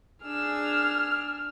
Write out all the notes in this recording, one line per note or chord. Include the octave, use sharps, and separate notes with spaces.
D4 G#4 E6 F6